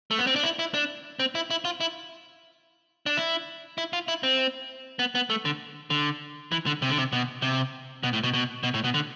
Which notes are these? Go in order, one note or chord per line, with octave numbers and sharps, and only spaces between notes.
A3
B3
C4
D4
E4
E4
D4
C4
E4
E4
F4
E4
D4
E4
E4
F4
E4
C4
B3
B3
A3
D3
D3
E3
D3
C3
D3
C3
B2
C3
B2
A2
B2
B2
B2
A2
B2
D3